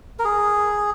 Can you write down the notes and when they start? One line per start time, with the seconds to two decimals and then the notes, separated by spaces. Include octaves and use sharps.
0.19 A#4
0.25 G#4